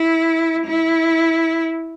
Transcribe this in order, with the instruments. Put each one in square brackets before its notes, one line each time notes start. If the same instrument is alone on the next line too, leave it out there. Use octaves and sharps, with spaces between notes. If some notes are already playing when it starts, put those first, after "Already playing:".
Already playing: [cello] E4
E4